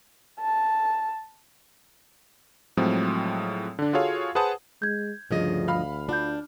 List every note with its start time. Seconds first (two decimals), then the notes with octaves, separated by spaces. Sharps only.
0.40 A5
2.77 A2 F3 F#3 G#3 C4
3.79 D3 D4
3.93 F4 F#4 G#4 A4 C#5 F5
4.35 G#4 B4 C5 F#5 A5 D#6
4.82 G#3 G6 G#6
5.31 D2 G2 C#3 F3 D#5
5.68 F5 B5 F6
6.09 D4 F4 F#5 G6